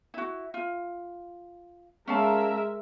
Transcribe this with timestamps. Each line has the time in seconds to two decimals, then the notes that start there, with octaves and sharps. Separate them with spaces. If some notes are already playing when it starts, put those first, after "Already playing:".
0.14 E4 F#4
0.54 F4
2.08 G#3 C#4 A#4 E5 F5 A5